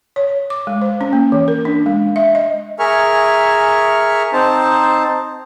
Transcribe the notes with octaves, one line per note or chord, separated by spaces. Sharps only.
C#5
D6
G#3
C5
C#4
A#3
E3
A#4
D4
G#3
E5
D#5
G#4 A#4 E5 G#5 C#6 F6
C4 D#4 C5 A5